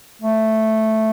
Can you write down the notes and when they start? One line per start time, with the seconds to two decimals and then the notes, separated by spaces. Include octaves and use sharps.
0.22 A3